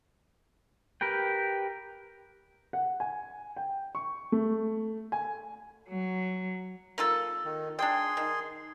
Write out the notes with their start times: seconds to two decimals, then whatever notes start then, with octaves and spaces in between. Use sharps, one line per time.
1.01 G4 A#4 B4 G5
2.73 F#5
3.00 G#5
3.56 G5
3.95 C#6
4.32 A3
5.12 G#5
5.88 F#3
6.98 A#3 F4 A4
7.45 D#3
7.79 D4 G#4 G5 C6
8.17 D#3